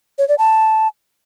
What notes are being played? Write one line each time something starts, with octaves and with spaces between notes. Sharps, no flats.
C#5
D5
A5